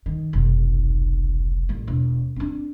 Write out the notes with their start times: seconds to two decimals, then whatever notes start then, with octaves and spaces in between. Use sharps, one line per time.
0.06 D#3
0.33 F1 B1
1.69 A1 A#3
1.88 E1
2.36 C4 D4